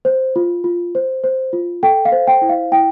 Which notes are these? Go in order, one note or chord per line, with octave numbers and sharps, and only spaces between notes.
C5
F4
F4
C5
C5
F4
A4 G5
F5
C5
G5
E4
F5
E4 G5